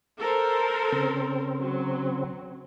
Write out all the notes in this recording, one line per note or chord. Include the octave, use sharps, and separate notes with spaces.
A4 A#4 C5
C#3 C4
F#3